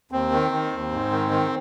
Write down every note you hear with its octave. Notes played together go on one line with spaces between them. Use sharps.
D#2 C4
D#3
D#3
D#2
G#2
D#3
D#3